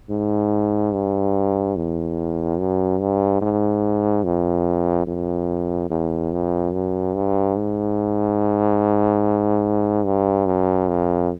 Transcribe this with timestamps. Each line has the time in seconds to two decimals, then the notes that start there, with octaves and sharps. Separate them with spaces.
0.10 G#2
0.93 G2
1.76 E2
2.59 F#2
3.00 G2
3.41 G#2
4.25 F2
5.07 F2
5.90 E2
6.32 F2
6.73 F#2
7.15 G2
7.56 G#2
10.05 G2
10.46 F#2
10.88 F2